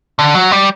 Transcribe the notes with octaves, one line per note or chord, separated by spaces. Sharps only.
D3
F#3
G3